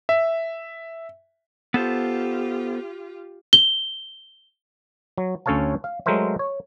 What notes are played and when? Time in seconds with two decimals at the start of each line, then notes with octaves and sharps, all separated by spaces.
0.09 E5
1.74 B3 F4 G4 A4 C5
3.53 G7
5.18 F#3
5.46 D2 C#4 A4 C#5 F5 A5
5.84 F5
6.06 F#3 G#3 A3 A#4 C5 E5
6.39 C#5